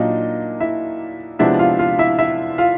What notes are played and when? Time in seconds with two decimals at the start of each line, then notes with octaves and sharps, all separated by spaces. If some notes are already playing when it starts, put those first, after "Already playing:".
Already playing: A#2 F#3 A#3 D4 D#4 D#5
0.60 E4 E5
1.39 C3 F3 G#3 B3 D4 E4 E5
1.59 F4 F5
1.79 F4 F5
1.99 E4 E5
2.19 E4 E5
2.58 F4 F5